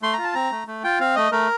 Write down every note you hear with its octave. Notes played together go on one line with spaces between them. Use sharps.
A3 C6
A#5
F4
A5
C4 A#5
A3
A3
F4 G5
C4 F5
A3 D#5
A3 A#4